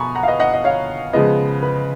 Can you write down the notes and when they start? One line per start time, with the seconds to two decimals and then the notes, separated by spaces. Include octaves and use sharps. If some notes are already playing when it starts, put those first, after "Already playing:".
Already playing: B2 G#5 A#5 B5 C#6
0.15 F#5 A#5
0.23 F5
0.28 B4 D#5
0.40 D#5 F#5
0.53 D#5
0.64 C#5 F5
1.13 C#3 F3 G#3 B3 B4 D#5
1.63 B4